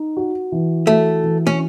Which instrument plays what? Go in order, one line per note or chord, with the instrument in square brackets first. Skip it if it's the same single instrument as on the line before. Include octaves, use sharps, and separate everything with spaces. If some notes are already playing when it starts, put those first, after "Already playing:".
Already playing: [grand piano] D#4
F#4
E3
[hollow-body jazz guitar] A3 [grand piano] F#4
[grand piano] E3
[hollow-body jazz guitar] C#4